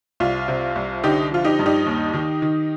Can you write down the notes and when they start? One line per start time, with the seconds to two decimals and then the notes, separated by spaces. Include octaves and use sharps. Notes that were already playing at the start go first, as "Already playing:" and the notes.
0.20 C2 F4
0.48 C3
0.76 C2
1.03 D3 D#4 G4
1.31 F3 F4
1.44 D#4 G4
1.59 G2
1.66 D#4 G4
1.86 D#2
2.14 D#3
2.42 D#3